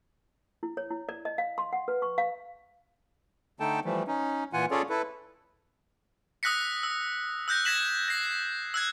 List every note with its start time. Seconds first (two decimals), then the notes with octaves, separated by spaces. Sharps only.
0.63 E4
0.77 C#5
0.90 E4
1.09 D5
1.25 D#5
1.38 F5
1.58 C6
1.73 F#5
1.88 B4
2.02 C#6
2.18 F5
3.60 D3 A3 D#4 A4 G5 A5
3.85 E3 F3 G3 A3
4.08 C#4 D#4
4.53 A#2 E3 F4 F#5 G#5
4.71 C#4 F4 G#4 A4 C#5 D5
4.89 E4 A4 B4
6.43 D#6 E6 F#6 A#6 B6 C#7
6.83 E6
7.48 E6 F#6 G6 A#6
7.65 G#6 A#6 B6 E7 F#7
8.08 A#6 C7
8.74 E6 F#6 G#6